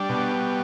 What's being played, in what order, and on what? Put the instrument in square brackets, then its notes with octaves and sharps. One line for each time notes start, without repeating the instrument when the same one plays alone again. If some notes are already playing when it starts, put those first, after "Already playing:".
Already playing: [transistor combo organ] G3 D4
B2